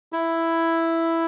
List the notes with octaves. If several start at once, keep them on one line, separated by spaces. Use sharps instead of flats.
E4